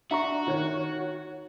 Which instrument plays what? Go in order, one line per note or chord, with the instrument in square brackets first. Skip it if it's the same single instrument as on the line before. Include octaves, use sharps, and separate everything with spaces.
[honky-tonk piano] D4 [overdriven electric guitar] F#4 [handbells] E5 A#5 C#6
[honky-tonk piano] D#3 C#5 F#6